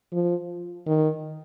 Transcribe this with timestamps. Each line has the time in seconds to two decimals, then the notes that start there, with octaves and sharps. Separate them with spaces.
0.12 F3
0.87 D#3